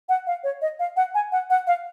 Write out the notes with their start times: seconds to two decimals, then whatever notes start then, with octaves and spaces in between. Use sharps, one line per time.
0.09 F#5
0.27 F5
0.44 C#5
0.62 D#5
0.79 F5
0.97 F#5
1.15 G#5
1.32 F#5
1.50 F#5
1.67 F5